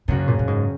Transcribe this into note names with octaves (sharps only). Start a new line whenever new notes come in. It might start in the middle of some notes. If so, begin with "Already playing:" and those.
F#1 F#2 C#3 F#3 A#3 F#4
A#2
A#2
G#2